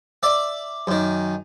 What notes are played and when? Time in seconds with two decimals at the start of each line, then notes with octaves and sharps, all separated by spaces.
0.23 D5 E5
0.87 F#2 D#3